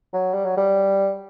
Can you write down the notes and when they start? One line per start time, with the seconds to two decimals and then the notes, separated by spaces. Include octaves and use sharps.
0.13 F#3
0.34 G3
0.45 F#3
0.57 G3